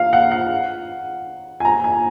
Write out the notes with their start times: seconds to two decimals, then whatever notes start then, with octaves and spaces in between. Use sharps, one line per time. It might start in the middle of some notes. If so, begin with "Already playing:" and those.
Already playing: F5
0.13 F#5
0.32 F#5
1.60 G#5
1.65 A#5
1.84 G#5